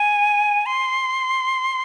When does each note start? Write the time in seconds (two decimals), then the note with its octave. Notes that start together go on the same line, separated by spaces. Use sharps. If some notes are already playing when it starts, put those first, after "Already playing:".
Already playing: G#5
0.66 C6